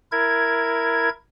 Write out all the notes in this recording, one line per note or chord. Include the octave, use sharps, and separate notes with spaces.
E4 A#4 G#6